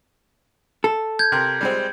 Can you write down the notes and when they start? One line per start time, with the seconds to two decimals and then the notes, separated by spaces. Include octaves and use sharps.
0.84 A4
1.19 G6 G#6
1.32 C3 A#4
1.61 G3 G#3 C4